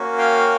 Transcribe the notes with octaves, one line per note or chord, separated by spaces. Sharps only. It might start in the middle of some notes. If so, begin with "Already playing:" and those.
Already playing: A#3 C#4 F#4
F5 G5